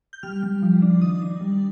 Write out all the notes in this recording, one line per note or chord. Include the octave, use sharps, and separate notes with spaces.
G6
G3 F6
G3
F3
D4
D#3 D#6
D4
G3